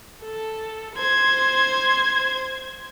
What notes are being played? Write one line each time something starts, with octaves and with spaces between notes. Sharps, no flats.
A4
C5 G#6